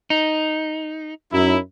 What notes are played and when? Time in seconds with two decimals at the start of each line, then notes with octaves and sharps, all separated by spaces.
0.10 D#4
1.33 F#2 D#4 E4